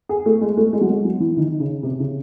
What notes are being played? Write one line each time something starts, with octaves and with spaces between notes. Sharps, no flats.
G#4
A3
G#3
A3
G#3
F#3
G#3
F#3
E3
D#3
C#3
C3
C#3